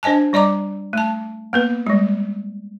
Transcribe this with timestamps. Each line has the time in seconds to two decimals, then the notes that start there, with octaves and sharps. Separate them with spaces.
0.03 D4 C5 D#5 G#5 A5
0.33 G3 D5 D#5 A#5 D6
0.93 A3 A5
1.53 A#3 B3 B4
1.87 G3 G#3